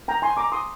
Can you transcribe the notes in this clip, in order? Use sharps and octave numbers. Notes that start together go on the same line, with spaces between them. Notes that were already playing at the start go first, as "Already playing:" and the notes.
G5 A#5
G#5 C6
A#5 D6
C6 D#6